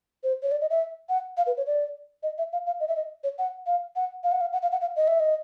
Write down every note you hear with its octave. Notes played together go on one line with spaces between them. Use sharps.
C5
C#5
D5
D#5
E5
F#5
F5
B4
C#5
D5
D#5
E5
F5
F5
D#5
E5
D#5
C#5
F#5
F5
F#5
F5
F#5
F5
F#5
F5
F#5
F5
D#5
E5
D#5